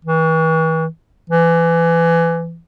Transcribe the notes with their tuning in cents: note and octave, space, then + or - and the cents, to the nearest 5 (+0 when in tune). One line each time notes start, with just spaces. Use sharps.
E3 -40
E3 +25